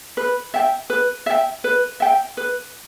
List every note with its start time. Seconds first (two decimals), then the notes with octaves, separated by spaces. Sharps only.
0.17 B4
0.54 E5 G5
0.90 B4
1.26 E5 G5
1.64 B4
2.00 E5 G5
2.37 B4